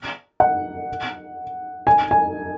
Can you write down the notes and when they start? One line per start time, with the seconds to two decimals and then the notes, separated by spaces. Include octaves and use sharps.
0.40 F#5
1.87 G#5
2.11 G#5